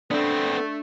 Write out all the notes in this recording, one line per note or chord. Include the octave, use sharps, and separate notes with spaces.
A3 B3 C4 D4 A4